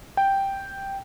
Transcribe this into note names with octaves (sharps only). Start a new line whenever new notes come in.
G5